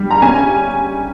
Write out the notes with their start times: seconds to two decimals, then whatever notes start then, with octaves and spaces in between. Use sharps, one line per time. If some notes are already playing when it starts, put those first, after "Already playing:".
Already playing: G3
0.11 A#5
0.22 C#4 G#5